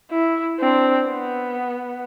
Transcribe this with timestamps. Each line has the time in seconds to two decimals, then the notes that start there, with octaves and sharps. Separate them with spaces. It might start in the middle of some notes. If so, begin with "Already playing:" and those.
0.11 E4
0.60 C4 D4
1.09 B3